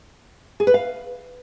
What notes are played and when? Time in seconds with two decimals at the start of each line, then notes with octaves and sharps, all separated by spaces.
0.60 G#4
0.67 B4
0.74 F5